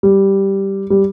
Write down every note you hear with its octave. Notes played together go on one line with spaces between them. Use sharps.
G3
G3